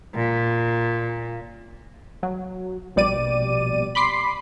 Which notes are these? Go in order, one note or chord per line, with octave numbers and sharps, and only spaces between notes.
A#2
F#3
A#1 B2 G3 D5 D6 D#7
B5 C6 D6 B6 C7